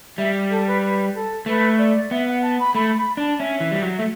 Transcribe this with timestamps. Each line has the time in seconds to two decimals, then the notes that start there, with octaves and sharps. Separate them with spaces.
0.18 G3 E5
0.50 A4
0.67 B4
0.83 B4
1.15 A4
1.46 A3 B4
1.78 D5
2.11 B3 E5
2.27 F#5
2.42 A5
2.59 B5
2.75 A3 B5
2.97 B5
3.17 D4 A5
3.39 C#4 E5
3.60 E3
3.71 G3
3.82 F#3
3.97 A3 E5